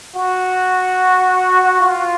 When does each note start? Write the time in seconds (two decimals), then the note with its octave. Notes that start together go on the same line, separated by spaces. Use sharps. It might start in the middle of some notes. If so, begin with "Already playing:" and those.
0.15 F#4
1.80 F4